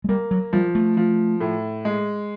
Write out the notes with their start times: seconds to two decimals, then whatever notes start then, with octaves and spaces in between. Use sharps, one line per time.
0.04 G#3
0.09 G3 A#3
0.31 F#3
0.53 F3 G3
0.75 A3
0.97 F3
1.41 A2
1.85 G#3